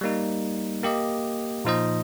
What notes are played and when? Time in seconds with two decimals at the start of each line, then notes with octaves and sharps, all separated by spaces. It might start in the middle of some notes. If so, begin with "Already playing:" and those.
0.01 G3 A#3 D#4
0.83 A#3 G4 D#5
1.65 A#2 F3 D#4 C5 D#5